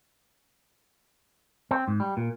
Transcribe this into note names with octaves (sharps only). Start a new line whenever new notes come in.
C4
G#2
G3
A#2